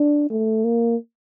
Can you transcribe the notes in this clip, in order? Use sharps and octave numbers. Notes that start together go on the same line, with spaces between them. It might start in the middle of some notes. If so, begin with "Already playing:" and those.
Already playing: D4
A3
A#3